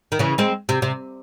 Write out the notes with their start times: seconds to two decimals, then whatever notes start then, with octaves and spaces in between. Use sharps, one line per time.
0.12 D#3
0.19 C#3 E3
0.38 G#3 C4
0.69 C3
0.82 C3